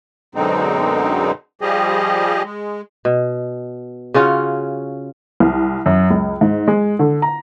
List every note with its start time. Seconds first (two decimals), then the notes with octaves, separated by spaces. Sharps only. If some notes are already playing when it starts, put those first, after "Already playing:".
0.35 F#2 B2 D3 G#3 C4 D#4
1.61 F3 G3 G4 G#4 D#5
2.44 G#3
3.05 B2
4.14 C#3 C#4 F4 F#4
5.40 C2
5.86 F#2
6.10 C#2
6.41 G#2
6.68 G#3
6.99 D3
7.22 A#5